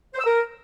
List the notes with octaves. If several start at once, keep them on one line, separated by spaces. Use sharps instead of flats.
C5
E6
A#4